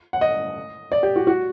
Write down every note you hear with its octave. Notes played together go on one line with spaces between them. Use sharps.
F#5
D#5
D5
G4
F#4
F#4